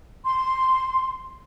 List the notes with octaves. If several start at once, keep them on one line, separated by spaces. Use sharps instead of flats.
C6